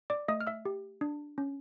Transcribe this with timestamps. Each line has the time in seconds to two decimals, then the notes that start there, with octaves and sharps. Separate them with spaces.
0.10 D5 D6
0.28 A3 D#5 D#6
0.40 F6
0.47 E5 E6
0.65 G4
1.01 D4
1.38 C#4